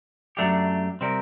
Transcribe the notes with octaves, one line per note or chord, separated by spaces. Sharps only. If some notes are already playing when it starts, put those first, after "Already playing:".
F#2 F#3 A3 D4 G4
C3 G3 C4 G4 A#4